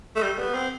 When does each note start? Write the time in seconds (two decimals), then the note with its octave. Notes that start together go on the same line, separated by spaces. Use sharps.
0.16 A3
0.23 G3
0.38 B3
0.54 C4